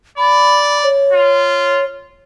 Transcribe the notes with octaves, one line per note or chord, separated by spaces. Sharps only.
D5 B5
C#5
F4